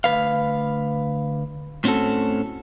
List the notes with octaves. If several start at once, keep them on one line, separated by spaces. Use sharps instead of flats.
D2 B2 B4 F5
A2 C4 C#4 F#4 A4